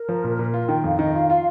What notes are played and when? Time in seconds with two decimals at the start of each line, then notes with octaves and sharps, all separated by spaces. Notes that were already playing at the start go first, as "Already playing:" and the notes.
Already playing: A#4
0.09 F3
0.24 A#2
0.39 A#2
0.54 F4
0.68 D#3 G5
0.84 F2 F5
0.99 D#3 D#5
1.14 F4 F5
1.29 F4 F5